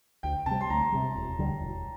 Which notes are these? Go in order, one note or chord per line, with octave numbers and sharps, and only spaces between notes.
D2 G5
C3 G3 A5
C6
D2 A#5
C3 G3
E1
D2 D3 G3
E1